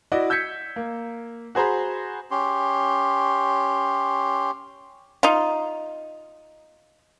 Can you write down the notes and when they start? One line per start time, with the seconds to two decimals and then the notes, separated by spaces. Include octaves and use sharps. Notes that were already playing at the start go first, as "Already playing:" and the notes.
0.12 E4 F#4 D5 D#5
0.30 E6 G6 G#6 B6 C#7
0.76 A#3
1.55 F#4 G#4 C5 A#5 B5
2.31 C#4 G4 C6
5.23 D#4 F4